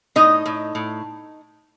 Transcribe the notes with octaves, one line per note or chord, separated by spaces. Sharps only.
A2 D#4 D#5
A2
A2